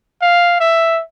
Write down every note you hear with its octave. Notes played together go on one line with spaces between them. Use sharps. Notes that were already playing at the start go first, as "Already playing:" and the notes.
F5
E5